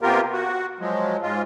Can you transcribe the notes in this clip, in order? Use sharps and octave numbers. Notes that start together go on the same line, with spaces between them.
C3 A#3 B3 F4 G4 A#4
F#4
F3 F#3 G#3
G#2 G#3 F4